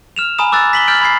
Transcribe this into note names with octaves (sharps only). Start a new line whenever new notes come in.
F6 E7 F7
G#5 A#5 B5 D#6 E7
D6 E6 F#6 A6
B6 F#7 G7
F6 G6 A6 D7 F#7
B5 G#6 C7